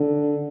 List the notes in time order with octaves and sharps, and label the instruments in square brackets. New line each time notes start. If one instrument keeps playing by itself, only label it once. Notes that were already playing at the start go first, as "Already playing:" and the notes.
Already playing: [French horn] D3